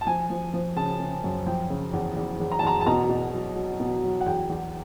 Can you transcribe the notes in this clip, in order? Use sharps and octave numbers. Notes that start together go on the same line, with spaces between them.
A5
F3 G#5
F3
F3
C#3 A5
C#3
F#2
F3 G5
C#3
E2
E2
E2
A#5
A5
E2 A#5
A5
B2 A#5
B2
F#3
F#3
B2
F#3
F#5
E2 G5
E2